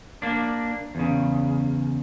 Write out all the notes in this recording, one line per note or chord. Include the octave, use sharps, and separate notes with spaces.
A#3 D4
E2 C#3